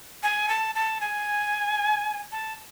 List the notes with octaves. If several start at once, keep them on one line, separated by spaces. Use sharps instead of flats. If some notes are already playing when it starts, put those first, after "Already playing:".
G#5
A5
A5
G#5
A5